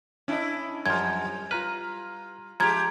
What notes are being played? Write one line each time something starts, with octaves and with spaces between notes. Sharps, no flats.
C#4 D4 E4 D#5
F#2 F3 G3 G#6
F4 B4 A#5 F6
F3 G#3 G4 A#5 G#6